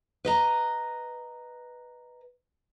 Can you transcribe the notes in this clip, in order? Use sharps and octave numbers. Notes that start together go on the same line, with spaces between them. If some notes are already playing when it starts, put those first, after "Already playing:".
B4 D#5 A#5